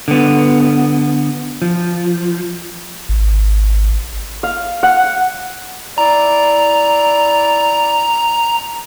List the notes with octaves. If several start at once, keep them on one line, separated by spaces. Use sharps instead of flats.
D3 B3
F3
G#1
F5
F#5
E4 D5 A#5